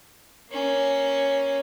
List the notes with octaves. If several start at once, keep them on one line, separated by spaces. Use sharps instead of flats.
A#3 C#4